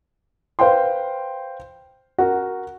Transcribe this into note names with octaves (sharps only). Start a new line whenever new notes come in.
B4 C5 F5 G5 C6
F#4 A#4